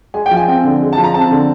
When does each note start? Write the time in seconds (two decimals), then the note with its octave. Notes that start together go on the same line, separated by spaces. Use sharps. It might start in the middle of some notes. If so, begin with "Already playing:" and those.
0.14 G#3 G#5
0.26 G5
0.31 F3
0.37 G#5
0.48 C4 G5
0.64 D3
0.82 G#3
0.93 A5
0.97 F3
1.04 A#5
1.14 C4 A5
1.31 D3